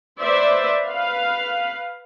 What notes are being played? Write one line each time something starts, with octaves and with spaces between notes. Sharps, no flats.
B4 C5 D5 E5
B4 F5